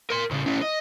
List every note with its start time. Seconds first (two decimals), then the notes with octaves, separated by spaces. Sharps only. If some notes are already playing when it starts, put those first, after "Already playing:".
0.10 A#4 C6
0.31 A2 C#3
0.46 C#4 E4
0.61 D#5